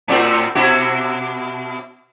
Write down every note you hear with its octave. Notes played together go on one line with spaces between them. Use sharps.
A2 C4 F#4
B2 E4 F#4